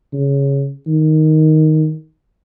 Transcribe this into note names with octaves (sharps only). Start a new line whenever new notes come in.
C#3
D#3